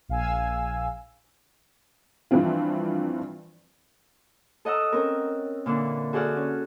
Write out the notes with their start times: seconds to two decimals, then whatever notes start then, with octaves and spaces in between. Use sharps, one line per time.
0.08 A#1 F5 G#5 E6
2.31 G2 E3 F3 C4 F4
4.65 A4 D#5 F#5 A#5 E6
4.92 C4 C#4 A#4
5.66 A#2 D3 E3 D4
6.13 F#4 G#4 A4 D5 F#5 F6
6.37 C#4